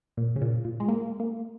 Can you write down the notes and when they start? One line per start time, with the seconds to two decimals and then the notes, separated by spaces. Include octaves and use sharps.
0.17 A#2
0.36 C#3
0.41 A#2
0.65 A#2
0.80 G#3
0.88 A#3
1.20 A#3